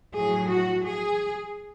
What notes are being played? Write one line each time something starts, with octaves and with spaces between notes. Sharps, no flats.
A2 F#3 G#4
F#4
G#4